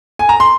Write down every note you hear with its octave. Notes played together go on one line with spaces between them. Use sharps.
G#5
A#5
C6